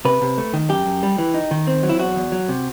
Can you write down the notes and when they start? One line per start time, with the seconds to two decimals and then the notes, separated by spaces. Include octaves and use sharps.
0.05 C3 B4
0.21 C3
0.38 A3
0.54 D#3
0.69 F#2 G4
0.86 F#2
1.03 G3
1.18 E3
1.34 D#4
1.51 D#3
1.67 C4
1.83 F#3
1.89 E4
1.99 E2 F#4
2.16 E2
2.32 F#3
2.49 C3